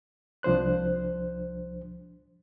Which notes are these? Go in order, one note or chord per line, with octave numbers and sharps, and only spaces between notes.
C2 F3 D4 C5 F#6